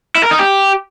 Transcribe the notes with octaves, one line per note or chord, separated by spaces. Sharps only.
E4
A#4
D#4
G4